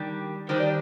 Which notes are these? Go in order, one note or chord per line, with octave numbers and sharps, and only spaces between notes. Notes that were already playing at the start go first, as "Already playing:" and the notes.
Already playing: D#3 G3 D4 G4
D#3 G3 D4 G4 C5
D5